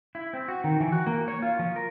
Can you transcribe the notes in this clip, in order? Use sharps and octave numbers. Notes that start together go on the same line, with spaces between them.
E4
C4
F#4
D#3
E3
F#4
A#3
C#5
F4
F3
A#4